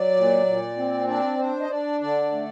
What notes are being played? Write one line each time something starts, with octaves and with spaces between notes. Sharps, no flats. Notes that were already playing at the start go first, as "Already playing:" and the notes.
Already playing: F#3 D5
A#2
A#2
C4
D4 D5
D4 C5
D#5
D4 D5
D3 D5
A3